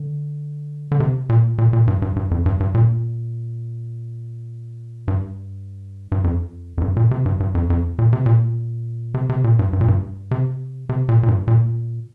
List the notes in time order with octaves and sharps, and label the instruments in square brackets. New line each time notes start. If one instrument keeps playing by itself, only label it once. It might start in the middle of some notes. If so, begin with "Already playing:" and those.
Already playing: [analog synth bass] D3
D3
C3
A#2
A#2
A#2
G2
G2
G2
F2
G2
G2
A#2
G2
G2
F2
F2
G2
A#2
C3
G2
G2
F2
F2
A#2
C3
A#2
C3
C3
A#2
G2
G2
A#2
G2
C3
C3
A#2
A#2
G2
A#2